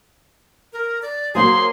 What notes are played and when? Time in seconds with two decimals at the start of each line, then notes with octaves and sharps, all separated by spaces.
0.73 A#4
1.02 D5
1.35 F#3 A#3 G#4 C5 C6